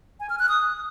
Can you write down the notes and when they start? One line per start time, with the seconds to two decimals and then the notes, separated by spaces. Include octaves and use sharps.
0.20 G#5
0.30 F6
0.39 F#6
0.49 D#6